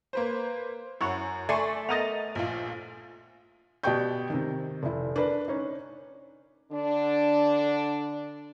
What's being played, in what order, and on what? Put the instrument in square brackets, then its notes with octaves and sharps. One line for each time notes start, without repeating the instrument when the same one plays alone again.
[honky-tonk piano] A#3 B4 C5
[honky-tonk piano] F#2 [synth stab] E4 C#5 F#5
[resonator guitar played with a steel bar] A3 [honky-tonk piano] D5 [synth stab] G#5 C6 C#6
[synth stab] B3 A#4 D#5 [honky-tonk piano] A6 D#7 F7
[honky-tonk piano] A#1 F4
[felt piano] B2 G4 D5 G5 C#6 G6
C3 D#3
F1 E4
D4 A#4 B4
C#4 D#4
[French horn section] D3 D4